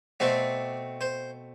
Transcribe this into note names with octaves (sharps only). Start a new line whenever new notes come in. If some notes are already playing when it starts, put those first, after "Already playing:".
B2 A3 C4 D5
C5